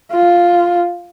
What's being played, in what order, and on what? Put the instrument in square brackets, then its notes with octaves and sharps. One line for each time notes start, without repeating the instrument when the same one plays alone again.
[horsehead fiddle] F4